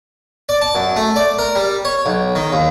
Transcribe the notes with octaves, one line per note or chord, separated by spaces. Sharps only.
D5
A5
F#2
A3
D5
A#4
G3
C#5
B1
D#3
D#2